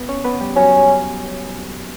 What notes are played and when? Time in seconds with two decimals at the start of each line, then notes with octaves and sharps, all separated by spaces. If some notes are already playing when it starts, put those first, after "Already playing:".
Already playing: B3 B4
0.09 C#4 C#5
0.24 B3 B4
0.41 G3 G4
0.56 F#3 C#4 F#4